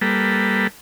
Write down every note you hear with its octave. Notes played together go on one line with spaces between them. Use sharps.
G3 A#3 A4 B4